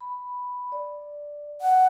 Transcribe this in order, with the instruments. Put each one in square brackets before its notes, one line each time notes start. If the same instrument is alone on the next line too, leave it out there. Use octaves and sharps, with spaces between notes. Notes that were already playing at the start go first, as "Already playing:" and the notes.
[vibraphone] B5
D5
[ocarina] F#5